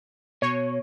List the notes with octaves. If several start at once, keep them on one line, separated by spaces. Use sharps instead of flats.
B2 C#5